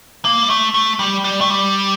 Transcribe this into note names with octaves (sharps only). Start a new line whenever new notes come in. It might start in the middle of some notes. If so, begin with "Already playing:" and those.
A#3
G3
A3
A3
G3
G3
A3
G3